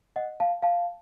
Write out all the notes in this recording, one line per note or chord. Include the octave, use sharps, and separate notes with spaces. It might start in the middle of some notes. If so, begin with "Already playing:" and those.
D#5 F#5
F5 A5
F5 A5